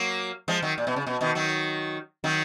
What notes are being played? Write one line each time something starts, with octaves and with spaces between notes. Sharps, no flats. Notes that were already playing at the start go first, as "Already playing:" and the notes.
Already playing: F#3 A#3
F3 G#3
D#3 F#3
A#2
B2
C#3
B2
B2 D#3
D#3 F#3
D#3 F#3